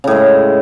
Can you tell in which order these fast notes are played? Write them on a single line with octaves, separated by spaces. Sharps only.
C#3 A2 G#3